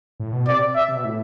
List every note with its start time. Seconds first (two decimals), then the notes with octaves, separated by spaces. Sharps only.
0.20 A2
0.33 B2
0.47 C3 D5
0.76 E5
0.89 C3
0.96 B2
1.05 A2